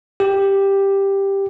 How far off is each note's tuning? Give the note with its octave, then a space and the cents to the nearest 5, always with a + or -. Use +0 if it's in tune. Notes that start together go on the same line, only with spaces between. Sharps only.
G4 +5